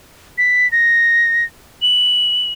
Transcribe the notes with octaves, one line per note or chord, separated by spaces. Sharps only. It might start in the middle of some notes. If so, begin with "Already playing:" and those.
B6
A#6
F#7